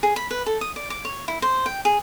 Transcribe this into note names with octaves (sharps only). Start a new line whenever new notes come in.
G#4
B5
B4
A4
D#6
D5
D6
C#5
E4
C5
G5
G#4